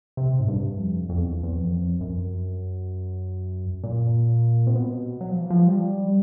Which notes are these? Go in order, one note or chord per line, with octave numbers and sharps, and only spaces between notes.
C3
G#2
G2
F2
F2
E2
E2
F2
F#2
A#2
C3
B2
F#3
F3
E3
F3
G3